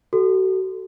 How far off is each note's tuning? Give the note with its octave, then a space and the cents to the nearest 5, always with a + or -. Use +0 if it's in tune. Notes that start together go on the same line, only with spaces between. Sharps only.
F#4 +35 A4 +0